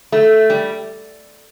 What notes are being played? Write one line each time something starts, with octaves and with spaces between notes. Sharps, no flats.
A3
G3